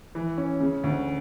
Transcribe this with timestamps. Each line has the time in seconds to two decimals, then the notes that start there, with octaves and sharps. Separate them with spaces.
0.15 E3
0.38 C#4
0.60 C#3
0.84 D2